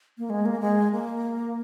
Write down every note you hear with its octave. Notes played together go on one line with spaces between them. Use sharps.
A#3
G#3
A#3
G#3
A#3